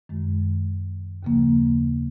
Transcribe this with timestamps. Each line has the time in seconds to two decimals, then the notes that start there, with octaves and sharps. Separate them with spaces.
0.09 F#2 D#3 G#3
1.23 D#2 C#3 F3 A#3